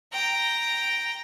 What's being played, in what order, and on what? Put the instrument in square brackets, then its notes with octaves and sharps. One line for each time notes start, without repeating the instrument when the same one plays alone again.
[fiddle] G5 A#5